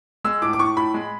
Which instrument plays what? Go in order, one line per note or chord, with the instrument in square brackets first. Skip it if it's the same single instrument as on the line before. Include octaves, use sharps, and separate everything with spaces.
[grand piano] G#3 E6
A2 D6
D6
A2 C#6
A2 B5
G#3